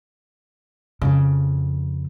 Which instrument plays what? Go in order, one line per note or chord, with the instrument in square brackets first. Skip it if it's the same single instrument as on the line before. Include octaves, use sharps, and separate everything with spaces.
[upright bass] F2 C#3